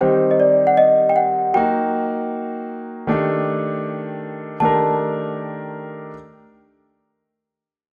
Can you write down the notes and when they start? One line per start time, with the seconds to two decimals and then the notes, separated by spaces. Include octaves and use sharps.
0.01 D#3 G3 C4 D#4 G4 C5
0.31 D#5
0.40 D5
0.67 F#5
0.77 D#5
1.09 G5
1.16 F#5
1.54 F#3 A#3 D#4 F#4 G5
3.07 D#3 A3 D4 G4
4.60 D#3 A3 D4 G4 A#4 A5